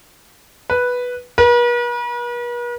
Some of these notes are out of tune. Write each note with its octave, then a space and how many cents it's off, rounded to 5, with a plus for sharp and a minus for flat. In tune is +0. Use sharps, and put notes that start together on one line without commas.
B4 -5
B4 -45